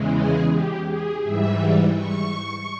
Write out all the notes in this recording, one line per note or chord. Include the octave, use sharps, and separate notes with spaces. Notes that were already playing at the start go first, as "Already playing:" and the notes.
Already playing: E2 C#3 E3 G#3
G#4
G4
G#4
G#2 E3 G3 E5
C#6